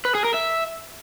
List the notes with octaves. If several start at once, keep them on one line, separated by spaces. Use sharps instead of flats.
B4
G#4
A#4
E5